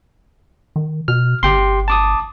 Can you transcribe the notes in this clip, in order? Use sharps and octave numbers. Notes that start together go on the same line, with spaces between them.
D#3
B2 F6
G1 G4 G5 C6
A5 D6 D#6